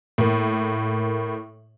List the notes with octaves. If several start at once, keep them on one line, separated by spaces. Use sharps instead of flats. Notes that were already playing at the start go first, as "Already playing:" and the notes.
A2 A#3